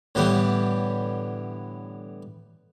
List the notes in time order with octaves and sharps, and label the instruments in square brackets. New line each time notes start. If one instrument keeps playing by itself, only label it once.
[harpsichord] A2 D3 E3 G3 B3 G4